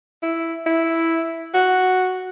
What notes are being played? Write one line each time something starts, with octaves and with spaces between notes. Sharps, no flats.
E4
E4
F#4